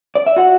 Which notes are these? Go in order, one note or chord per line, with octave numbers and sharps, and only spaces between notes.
D5
E5
F#4 F#5